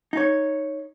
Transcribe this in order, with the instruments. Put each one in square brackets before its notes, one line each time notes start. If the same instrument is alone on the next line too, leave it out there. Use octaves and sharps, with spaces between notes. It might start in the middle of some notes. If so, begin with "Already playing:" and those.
[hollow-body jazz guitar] D#4 C#5